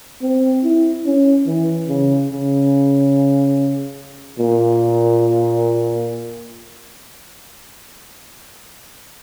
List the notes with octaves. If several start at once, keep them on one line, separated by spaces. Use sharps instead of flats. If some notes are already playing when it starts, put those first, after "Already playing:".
C4
E4
C#4
E3
C#3
C#3
A#2